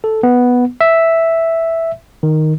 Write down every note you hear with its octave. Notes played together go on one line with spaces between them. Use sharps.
A4
B3
E5
D#3